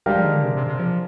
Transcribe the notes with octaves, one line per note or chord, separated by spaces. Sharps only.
G3 G#3 D4 G4 A#4 F5
F3
D#3
D3
C3
C3
C3
F3